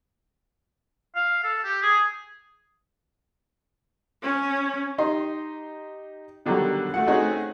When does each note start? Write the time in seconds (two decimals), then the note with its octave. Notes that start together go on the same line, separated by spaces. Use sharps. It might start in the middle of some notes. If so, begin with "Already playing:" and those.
1.15 F5
1.44 A4
1.64 G4
1.82 G#4
4.23 C#4
4.98 D#4 G4 C6
6.46 B2 D3 D#3 F#3 G3 F#4
6.94 A3 F#4 F#5
7.07 A3 C4 C#4 D#4 F#4 G#4